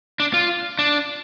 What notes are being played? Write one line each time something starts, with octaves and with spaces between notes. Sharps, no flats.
D4
F4
D4